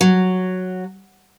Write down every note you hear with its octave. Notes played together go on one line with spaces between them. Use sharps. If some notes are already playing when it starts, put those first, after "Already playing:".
F#3